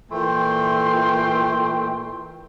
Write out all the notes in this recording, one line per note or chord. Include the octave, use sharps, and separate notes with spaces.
A#2 E3 A3 G5 C6